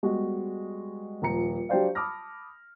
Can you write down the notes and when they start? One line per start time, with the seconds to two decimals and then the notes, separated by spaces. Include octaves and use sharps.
0.03 G3 G#3 B3 F#4
1.22 D#1 F3 A#5 C#7
1.69 F#3 D4 G4 C5 D5 F5
1.95 A5 B5 D6 D#6 F6 A#6